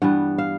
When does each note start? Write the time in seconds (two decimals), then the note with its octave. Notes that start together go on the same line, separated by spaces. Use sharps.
0.02 G2 E3 G3 B3 F#5
0.38 F5